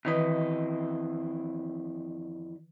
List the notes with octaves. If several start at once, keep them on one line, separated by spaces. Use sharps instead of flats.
F2 D#3 E3 E4 B4 D#5